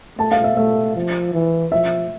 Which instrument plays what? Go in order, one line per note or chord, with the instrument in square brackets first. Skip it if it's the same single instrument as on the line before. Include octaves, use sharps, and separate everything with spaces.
[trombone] A3 [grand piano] A5
[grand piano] F5
E5
[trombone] A3 [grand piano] E5
[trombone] F3
E3
[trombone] F3 [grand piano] E5